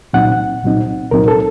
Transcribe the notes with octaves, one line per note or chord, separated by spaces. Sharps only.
C2 A#2 F#3 C4 D#4 F#5
C2 A#2 F#3 C4 D#4
C2 A#2 F#3 C4 D#4 A#4
A4